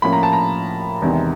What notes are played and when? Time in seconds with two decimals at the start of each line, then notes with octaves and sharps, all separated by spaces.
0.02 A2 F3 A#3 C#4 B5
0.13 A#5
0.23 A5
0.33 A#5
1.02 E2 C3 D#3 G#3